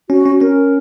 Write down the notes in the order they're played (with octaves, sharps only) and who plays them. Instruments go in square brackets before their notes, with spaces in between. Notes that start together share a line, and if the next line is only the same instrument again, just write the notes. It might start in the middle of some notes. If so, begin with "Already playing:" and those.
[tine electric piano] C#4 [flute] F#4
[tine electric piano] C#4
[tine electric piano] C#4 [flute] A#4